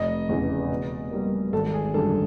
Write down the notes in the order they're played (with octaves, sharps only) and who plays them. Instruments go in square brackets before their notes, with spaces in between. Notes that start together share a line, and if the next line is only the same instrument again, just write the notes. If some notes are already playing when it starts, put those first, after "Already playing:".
Already playing: [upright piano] F1 [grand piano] D#5
[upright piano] E2 C#3 E3
B2
G3 A#3
[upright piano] G#1 [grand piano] A4
[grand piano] G#4
[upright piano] F#2 D3 G3 [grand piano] A4